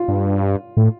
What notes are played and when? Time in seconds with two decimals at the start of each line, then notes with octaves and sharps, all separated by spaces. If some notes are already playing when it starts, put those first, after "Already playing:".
Already playing: F4
0.08 G2
0.77 A2